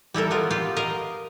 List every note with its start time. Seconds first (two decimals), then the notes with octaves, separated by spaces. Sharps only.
0.14 G3 E4 A4 A#4
0.31 B3 F4 A#4
0.50 F4 G4 F5
0.76 A#4 D#5 F5 A#5